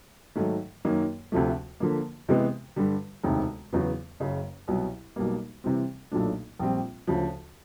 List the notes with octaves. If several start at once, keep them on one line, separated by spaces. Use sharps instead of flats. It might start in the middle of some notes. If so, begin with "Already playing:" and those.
G#2 D#3 F#3 A3
F#2 D#3 F#3 A#3
D2 C3 F3 A3
D3 F3 A#3
C3 E3 G#3 B3
G2 D3 G3
E1 D2 C3 D#3
E2 C#3 F#3 B3
F#1 F#2 C#3
C2 B2 F#3
B1 B2 G3 A#3
C3 E3 G3 C4
B1 A#2 F#3 A3 D4
A#1 A#2 G3 C4
D2 C#3 F3